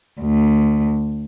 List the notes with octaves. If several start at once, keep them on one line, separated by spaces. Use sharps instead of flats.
D2